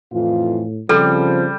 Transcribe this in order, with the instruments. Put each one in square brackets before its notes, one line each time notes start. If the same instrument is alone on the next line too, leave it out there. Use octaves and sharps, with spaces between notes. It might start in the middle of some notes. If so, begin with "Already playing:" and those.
[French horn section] F2 E3 F4 [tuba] A2
[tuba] C#3 [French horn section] F3 C4 [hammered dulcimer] G3 [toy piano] A4